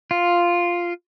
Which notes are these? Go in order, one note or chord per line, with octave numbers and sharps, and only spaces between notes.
F4